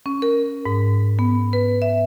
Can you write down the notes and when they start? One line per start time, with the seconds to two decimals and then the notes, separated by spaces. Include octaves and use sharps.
0.06 C#4
0.22 A#4
0.66 G#2
1.19 B3
1.53 B4
1.82 E5